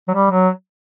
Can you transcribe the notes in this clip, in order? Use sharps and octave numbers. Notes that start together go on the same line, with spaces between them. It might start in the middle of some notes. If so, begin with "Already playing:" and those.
F#3
G3
F#3